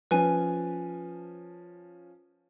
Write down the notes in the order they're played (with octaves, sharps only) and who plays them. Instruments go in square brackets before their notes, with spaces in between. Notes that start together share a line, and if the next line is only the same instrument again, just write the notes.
[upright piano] F3 C#4 [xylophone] B4 G#5